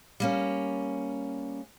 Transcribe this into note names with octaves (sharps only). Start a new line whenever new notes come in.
G3 A#3 C#4